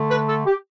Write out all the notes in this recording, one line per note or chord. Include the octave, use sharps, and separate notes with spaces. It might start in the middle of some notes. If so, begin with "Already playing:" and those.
Already playing: D3 A3
B4
A4
G4